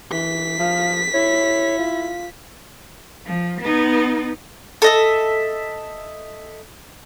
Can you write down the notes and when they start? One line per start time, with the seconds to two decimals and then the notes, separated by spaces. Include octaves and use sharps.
0.12 E3 B6
0.59 F3 F5
1.14 E4 C#5
1.79 F4
3.26 F3
3.61 B3 D#4
4.82 A4 D#5 E5